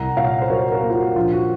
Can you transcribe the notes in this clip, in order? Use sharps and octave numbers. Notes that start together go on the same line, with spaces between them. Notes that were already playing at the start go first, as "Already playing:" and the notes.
Already playing: C2 F#5 A#5
A#2 C#5 F5
C5
F#3 A#4 C#5
F#4 A#4
A#3
F4
F#4
A#1 F4
F#4